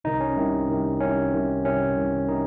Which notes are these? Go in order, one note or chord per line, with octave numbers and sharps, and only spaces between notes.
C2 C3 D#3 D#4
C#4
C2 C3 D#3
C2 C3 D#3
C2 C3 D#3 C#4
C2 C3 D#3
C2 C3 D#3 C#4
C2 C3 D#3
C3 D#3 D#4